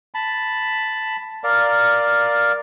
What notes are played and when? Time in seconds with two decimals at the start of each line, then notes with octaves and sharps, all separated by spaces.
0.14 A5 B5
1.44 A#4 D5 F5